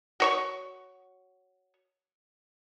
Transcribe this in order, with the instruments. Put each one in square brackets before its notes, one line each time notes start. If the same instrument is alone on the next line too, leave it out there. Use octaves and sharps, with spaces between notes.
[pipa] F#4 C#5 C#6